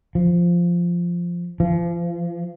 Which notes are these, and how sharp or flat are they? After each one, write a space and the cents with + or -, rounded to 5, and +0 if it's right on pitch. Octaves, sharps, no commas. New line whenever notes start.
F3 -5
F3 -30